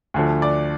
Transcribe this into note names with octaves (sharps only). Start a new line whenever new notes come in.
D2 D3 F3
D5